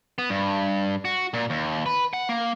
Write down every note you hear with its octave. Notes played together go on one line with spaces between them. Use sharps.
B3
G2
F#4
A#2
D#2
B4
F#5
A#3